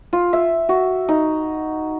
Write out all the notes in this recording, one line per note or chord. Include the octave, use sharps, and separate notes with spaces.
F4
E5
F#4
D#4